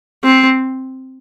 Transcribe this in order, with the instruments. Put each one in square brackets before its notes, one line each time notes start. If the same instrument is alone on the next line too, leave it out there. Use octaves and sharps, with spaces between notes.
[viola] C4